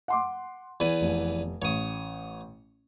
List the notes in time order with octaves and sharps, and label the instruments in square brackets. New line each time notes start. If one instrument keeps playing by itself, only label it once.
[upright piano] F#5 C6 D6
[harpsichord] E2 B4 G#5
[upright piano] F1
[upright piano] A1 [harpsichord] C#5 D#6